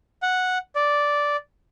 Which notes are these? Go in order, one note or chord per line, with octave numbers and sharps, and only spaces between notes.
F#5
D5